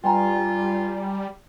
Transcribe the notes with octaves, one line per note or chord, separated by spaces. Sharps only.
G2 G3 F4 G5 G#5 A#5